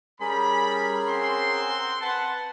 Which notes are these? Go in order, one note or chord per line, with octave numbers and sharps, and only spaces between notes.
G3 C#4 G#4 A#4 B5
C4 F#5 C6
B4 F#5 A5